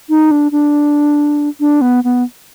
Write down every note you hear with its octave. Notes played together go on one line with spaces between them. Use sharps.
D#4
D4
D4
D4
B3
B3